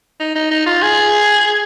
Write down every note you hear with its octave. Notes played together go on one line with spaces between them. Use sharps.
D#4
D#4
D#4
F4
G#4